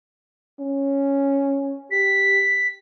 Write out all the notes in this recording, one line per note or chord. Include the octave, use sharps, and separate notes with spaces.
C#4
G4 B6